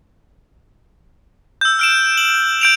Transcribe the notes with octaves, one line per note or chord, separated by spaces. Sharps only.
E6 G6
F6 D7 E7
F#7
G6 D7 F7